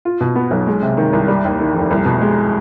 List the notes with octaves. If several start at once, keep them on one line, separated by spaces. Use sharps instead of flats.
F4
B2
B3
B1
G#3
C3
D#3
C2
G3
D#2
D#3
F1
C2
B2
G#3